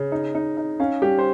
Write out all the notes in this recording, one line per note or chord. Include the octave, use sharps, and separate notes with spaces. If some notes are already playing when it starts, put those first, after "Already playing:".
Already playing: C#3
D#4
D#4
D#4
C#4 F5
G3 G4
C5